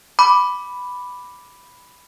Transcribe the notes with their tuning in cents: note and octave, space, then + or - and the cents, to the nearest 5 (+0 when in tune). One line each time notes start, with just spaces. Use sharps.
B5 +0 D6 +0